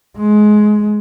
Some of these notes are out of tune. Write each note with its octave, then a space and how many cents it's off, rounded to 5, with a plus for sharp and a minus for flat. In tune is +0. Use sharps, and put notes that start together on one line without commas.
G#3 +20